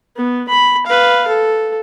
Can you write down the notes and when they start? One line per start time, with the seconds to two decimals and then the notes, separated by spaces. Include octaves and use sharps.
0.17 B3
0.49 B5
0.87 B4 F5
1.28 A4